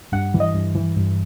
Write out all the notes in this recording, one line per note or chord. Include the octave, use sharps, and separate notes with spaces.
G2 F#5
E3
D#5
G2
E3
G2